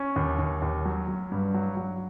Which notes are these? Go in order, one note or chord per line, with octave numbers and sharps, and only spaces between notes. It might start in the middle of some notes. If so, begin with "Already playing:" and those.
Already playing: C#4
D#2
D#2
D#2
F#3
F#3
G2
F#3
F#3